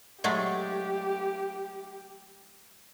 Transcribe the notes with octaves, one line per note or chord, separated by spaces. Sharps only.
F#3 G#3 A3 G4